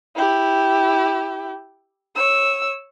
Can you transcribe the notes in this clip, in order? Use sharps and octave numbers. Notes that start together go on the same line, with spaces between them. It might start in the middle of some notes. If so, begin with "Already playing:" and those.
E4 G4
C#5 E6